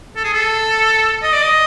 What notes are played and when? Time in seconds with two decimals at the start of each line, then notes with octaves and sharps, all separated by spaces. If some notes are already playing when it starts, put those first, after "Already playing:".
0.16 A4
0.25 G#4
0.33 A4
1.22 D#5
1.33 D5
1.43 D#5